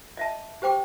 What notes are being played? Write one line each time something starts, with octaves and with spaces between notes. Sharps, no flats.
D#5 E5 A5
G4 C5 G5 D6